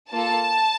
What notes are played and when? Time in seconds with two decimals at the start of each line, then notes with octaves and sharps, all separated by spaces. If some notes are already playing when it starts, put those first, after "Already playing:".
0.12 A#3 F4 A4 A5